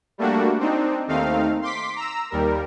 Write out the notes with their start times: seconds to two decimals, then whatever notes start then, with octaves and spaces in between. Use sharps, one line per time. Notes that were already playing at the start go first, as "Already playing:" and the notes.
0.18 G3 A3 A#3 D4 F#4
0.59 C4 D4 D#4
1.07 D#2 A3 C4 D#4 F5
1.62 C6 D6 B6
1.96 A#5 E6
2.31 D#2 G3 A#4